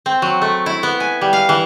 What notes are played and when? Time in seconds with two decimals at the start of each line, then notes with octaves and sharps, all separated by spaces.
0.06 C4
0.22 F#3
0.42 A3
0.66 E4
0.83 B3
1.00 G#5
1.21 G3
1.33 F5
1.49 E3